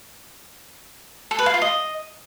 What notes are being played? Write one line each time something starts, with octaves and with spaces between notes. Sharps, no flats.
A4
B4
F5
F4
D#5